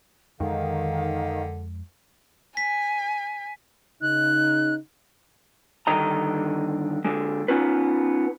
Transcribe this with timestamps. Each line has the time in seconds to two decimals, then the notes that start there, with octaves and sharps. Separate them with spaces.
0.40 F2 D3 D#3 G#3 F5
2.57 G#5 B6
4.02 C#3 D#4 F#6
5.87 G2 D3 D#3 D#5 A#5
7.05 D3 G#3
7.48 B3 C#4 D#4 F4 B4